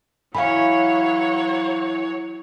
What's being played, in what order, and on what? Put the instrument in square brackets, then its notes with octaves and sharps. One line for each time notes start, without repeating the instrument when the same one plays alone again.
[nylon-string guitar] E3 [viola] F#3 C#5 [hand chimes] F5 B5